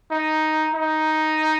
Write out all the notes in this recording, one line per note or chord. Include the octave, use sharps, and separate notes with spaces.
D#4
D#4